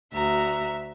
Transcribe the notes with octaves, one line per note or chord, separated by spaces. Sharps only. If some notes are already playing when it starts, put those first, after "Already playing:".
D2 F#4 E5 A#5